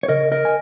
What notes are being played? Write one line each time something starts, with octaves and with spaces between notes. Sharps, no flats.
C#5
C#3 A#4 D#5
A#4 D#5
G#5